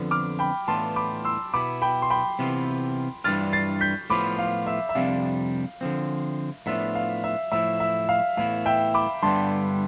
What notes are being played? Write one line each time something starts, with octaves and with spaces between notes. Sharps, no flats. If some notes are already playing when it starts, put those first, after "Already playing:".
Already playing: F2 D3 F3 B3
D6 F6
G5 B5
A2 E3 B3 D4 F4 A5 C6
B5 D6
C6 E6
B2 B3 E4 B5 D6
G5 B5
C6
G5 B5
C3 E3 B3 F4
G2 E3 G3 D4 F4 F6 A6
A6 C7
G6 B6
A2 F3 B3 F4 B5 D6
F5
E5
E5
F2 C3 G3 D4 F5
D3 F3 C4
A2 F3 B3 D4 F4 E5
F5
E5
A2 F3 A3 E4 E5
E5
F5
A2 E3 B3 E4 F5
E5 G5
B5 D6
G2 D3 G3 B3 A5 C6